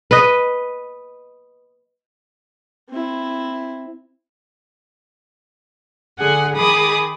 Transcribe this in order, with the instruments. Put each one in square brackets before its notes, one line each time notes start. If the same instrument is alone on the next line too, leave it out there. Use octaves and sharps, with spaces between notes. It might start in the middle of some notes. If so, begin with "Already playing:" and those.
[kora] B4 D#5
[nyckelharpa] C4 E4
[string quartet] D3 G#4 F#5 G#5
D#3 G#4 B5 D6 D#6